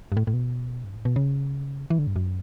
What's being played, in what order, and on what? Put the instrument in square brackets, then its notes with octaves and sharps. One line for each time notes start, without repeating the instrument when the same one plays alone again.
[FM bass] G2
A2
A2
B2
G2
A2
B2
C#3
E3
D3
G2
F#2